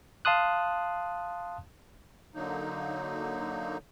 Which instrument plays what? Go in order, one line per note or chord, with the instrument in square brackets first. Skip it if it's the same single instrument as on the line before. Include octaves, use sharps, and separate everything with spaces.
[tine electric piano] F5 A5 C6 D#6 F#6
[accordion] D3 F#3 A#3 D#4